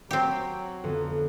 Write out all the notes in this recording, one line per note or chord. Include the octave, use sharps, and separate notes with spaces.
F#3 C4 G4
F2 D3 B3